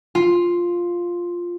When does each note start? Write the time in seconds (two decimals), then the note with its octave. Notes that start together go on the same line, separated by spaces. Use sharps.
0.15 F4